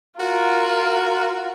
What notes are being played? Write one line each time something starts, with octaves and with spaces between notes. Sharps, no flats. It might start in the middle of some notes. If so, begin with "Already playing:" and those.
F4 F#4 A#4